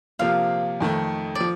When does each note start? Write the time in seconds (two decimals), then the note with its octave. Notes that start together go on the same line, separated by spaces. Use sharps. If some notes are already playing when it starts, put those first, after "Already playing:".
0.19 C3 F3 A#3 F4 F5
0.80 F2 D#3 A3
1.35 D5
1.40 F3